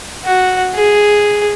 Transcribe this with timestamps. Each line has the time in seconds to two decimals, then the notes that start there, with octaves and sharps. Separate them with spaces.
0.24 F#4
0.74 G#4